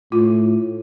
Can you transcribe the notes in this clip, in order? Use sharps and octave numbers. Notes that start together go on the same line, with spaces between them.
A2 F4